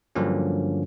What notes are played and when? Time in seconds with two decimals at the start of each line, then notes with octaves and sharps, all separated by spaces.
0.15 G2 D3 F3 F#3 A#3 C#4